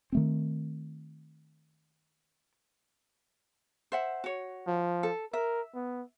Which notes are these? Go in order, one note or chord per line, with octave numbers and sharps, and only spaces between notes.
D#3 A3 C4
C5 E5 F#5
F#4 C#5
F3
A4
A#4 E5
B3